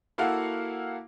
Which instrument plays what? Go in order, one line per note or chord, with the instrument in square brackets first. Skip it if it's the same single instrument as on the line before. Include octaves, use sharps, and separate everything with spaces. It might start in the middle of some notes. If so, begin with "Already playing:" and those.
[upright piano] A#3 E4 F#4 A4 F5 F#5